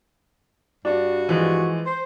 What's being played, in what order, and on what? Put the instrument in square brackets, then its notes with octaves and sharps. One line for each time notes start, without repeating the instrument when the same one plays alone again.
[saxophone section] G2 F#4 [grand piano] D4
[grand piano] E3 F3 G#3
[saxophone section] C5